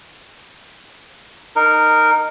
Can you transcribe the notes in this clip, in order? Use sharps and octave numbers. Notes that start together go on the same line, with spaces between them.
D#4 A#4